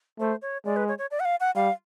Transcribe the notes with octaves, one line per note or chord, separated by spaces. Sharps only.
A3 C5
C#5
G#3 D5
B4
C#5
C#5
D5
F#5
F5
F#5
G3 F5